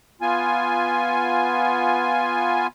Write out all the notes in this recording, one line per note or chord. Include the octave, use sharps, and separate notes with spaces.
B3 F4 G#5